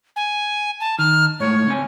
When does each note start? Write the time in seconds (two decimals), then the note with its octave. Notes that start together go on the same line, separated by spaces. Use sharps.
0.16 G#5
0.80 A5
0.99 D#3 F6
1.40 G#2 A3 C#5
1.66 C#2 C4 G#5